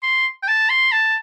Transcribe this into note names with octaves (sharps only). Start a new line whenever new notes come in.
C6
G5
A5
C6
A5